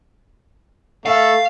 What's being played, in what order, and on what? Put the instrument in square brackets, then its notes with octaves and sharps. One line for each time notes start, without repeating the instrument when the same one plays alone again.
[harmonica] A3 [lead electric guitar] F5